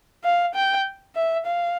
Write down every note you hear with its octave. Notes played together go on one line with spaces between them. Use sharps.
F5
G5
E5
F5